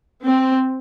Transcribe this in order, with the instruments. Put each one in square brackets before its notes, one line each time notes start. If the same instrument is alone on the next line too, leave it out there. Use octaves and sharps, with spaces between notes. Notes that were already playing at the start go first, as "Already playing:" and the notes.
[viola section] C4